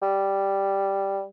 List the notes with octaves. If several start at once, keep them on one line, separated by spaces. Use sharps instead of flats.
G3